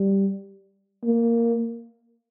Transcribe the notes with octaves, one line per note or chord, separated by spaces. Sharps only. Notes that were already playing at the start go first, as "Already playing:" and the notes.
Already playing: G3
A#3